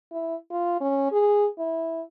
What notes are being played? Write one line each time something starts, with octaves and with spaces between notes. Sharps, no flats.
E4
F4
C#4
G#4
E4